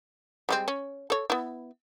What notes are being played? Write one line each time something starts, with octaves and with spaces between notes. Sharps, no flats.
G3 G#3 C4
C#4
A4 C#5
B3 E4